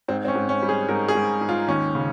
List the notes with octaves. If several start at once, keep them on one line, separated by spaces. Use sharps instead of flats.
G#2 C4
C4
C#4
G#2
C#4
G3
G#4
G#2 A#4
G#4
G#2
G#2
F4
D#2 C#4
C#3